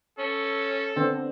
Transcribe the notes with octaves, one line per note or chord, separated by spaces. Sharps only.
C#4 A4
D3 B3 C4